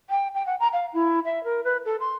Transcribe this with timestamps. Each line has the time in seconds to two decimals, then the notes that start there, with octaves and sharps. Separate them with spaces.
0.10 G5
0.35 G5
0.46 F#5
0.60 A#5
0.73 F5
0.93 E4
1.25 E5
1.44 A#4
1.64 B4
1.85 A4
2.00 C6